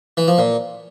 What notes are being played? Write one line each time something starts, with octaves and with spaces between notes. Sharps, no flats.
E3
F3
A#2